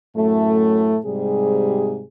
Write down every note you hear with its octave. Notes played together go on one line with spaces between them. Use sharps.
F#2 A2 A3
G#2 C3 G3 G#4